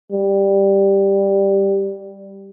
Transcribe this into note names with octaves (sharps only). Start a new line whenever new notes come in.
G3